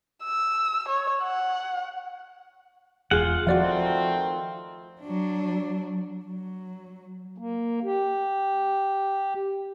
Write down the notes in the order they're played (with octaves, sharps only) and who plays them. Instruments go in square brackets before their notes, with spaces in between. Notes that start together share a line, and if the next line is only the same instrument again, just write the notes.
[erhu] E6
C#5
F#5
[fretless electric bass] E1 [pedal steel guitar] F4 F#5 [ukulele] G#4
[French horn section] D#3 A3 C4 [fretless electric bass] F3 [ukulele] F#4 D5 F5
[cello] F#3 D4
F#3
[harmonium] A#3
G4